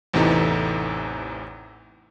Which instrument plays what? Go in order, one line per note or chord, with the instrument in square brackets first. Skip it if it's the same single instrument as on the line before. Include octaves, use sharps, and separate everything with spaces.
[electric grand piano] A1 E2 C3 E3 D#4 A4